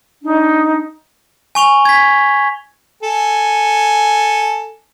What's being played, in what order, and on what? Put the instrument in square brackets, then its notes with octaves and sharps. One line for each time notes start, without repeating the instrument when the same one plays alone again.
[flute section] D4 D#4
[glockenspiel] G#5 C#6 F7 G7
G#6 B6
[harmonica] A4 G#5